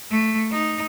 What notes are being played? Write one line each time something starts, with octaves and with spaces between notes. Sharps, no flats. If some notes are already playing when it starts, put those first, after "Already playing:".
A3
D#4